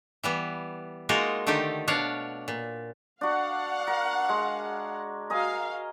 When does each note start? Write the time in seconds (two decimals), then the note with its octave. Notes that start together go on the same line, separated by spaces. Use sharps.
0.24 E3 G3 B3
1.09 G#3 A#3 D#4 F4 F#4 A#4
1.47 D3 D#3 A3 D#4 G4
1.88 B2 D4 C#5 F5 F#5
2.48 A#2
3.21 D4 F#4 F5 F#5
3.87 A#4
4.29 G#3
5.30 F#4 A#4 D#5 F5 G#5